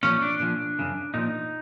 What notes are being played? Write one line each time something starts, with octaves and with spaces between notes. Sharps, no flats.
A#2 F3 C#4
D4
A#2 F3
F#2 C#3
A#2 F3 D#4